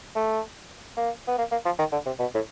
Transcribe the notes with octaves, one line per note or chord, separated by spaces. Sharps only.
A3
A#3
B3
A#3
A#3
F3
D#3
D3
C3
B2
A2